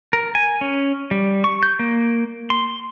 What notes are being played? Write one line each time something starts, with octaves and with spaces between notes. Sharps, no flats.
A#4
G#5
C#4
G3
C#6
G6
A#3
C6